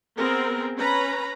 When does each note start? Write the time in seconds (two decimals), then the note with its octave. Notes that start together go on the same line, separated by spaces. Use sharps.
0.17 B3 C4 G#4 A#4
0.77 C#4 B4 A#5 B5